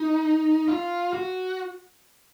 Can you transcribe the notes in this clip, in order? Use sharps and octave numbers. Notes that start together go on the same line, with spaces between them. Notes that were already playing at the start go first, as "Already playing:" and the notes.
Already playing: D#4
F4
F#4